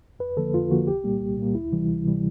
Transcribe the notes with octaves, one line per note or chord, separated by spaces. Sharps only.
F2 B4
D3 F3 A#3 A4
F2 F4
D3 F3 A#3 F#4
C2 G4
A#2 G3 A#3
C2
A#2 G3 A#3
D2 E4
C3 E3 G3
D2
C3 E3 G3